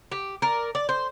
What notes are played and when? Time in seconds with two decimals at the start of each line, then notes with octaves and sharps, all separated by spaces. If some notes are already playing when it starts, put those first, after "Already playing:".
0.12 G4
0.42 A#4 D5
0.75 D5
0.89 C5